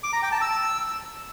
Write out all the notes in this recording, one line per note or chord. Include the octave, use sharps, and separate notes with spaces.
D6
A#5
G5
A5
E6